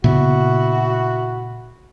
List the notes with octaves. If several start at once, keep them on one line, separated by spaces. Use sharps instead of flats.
A#2 C#3 B3 E4 F#4